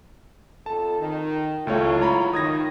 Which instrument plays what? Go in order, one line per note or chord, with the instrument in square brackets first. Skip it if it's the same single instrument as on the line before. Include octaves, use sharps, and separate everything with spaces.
[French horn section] F2 A4 [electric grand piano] A5
[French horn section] D#3
[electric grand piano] C#2 A3 C#5 [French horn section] F#3 E4 F4
[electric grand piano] C#5 A#5 B5
[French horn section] D#3 [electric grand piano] D#6 G#6 A#6